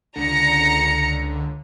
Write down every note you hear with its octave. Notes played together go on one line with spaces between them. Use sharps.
C#2 D3 A#5 A#6 C#7